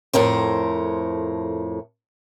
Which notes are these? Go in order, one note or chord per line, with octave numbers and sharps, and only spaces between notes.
F2 A2 A#4 C5